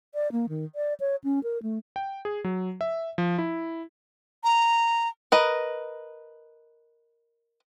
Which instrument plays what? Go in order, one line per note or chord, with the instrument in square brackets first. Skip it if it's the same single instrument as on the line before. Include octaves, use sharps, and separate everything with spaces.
[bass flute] D5
A#3
D#3
D5
C#5
C#4
A#4
A3
[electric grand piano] G5
G#4
F#3
E5
F3
E4
[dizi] A#5
[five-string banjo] A#4 B4 D#5